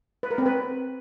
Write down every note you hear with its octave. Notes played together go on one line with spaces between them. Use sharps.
B4
A#4
C4
B4